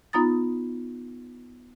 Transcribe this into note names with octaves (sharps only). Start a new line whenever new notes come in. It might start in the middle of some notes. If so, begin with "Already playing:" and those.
B3 D#4 F4 A#5 D#6 A6